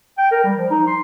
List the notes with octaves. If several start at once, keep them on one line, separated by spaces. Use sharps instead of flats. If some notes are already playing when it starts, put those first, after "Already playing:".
G5
A#4
G3
F3
D#4
C6